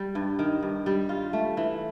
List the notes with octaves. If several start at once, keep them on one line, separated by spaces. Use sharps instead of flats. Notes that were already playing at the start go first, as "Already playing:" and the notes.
Already playing: G3
G2
D#3
G2
G3
F4
A3
E3